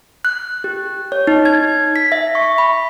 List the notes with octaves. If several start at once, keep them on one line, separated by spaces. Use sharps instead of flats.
F#6
G4
C#5
D#4
G#6
B6
E5
C#6
B5